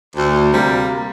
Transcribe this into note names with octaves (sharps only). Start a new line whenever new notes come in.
D2
C3 G3 A#3